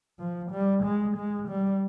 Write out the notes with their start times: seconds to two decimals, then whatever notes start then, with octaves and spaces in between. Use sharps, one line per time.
0.19 F3
0.51 G3
0.83 G#3
1.16 G#3
1.48 G3